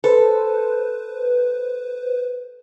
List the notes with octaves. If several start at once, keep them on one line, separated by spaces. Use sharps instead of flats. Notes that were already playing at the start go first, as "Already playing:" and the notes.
A4 B4 C5